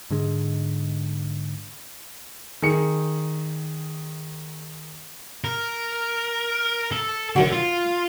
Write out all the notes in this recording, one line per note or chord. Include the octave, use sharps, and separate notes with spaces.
G#2 D3 G#3
D#3 G#4 C#7
A#4
A4
D3 D#3 F#3 F#4
F4